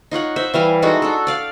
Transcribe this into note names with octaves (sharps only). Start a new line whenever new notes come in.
D#4 F4 C#5 F#5
C5 E5
E3 G3 F5 G#5
G#3 D#4 F#4 A4
D4 A4
D5 F5 D6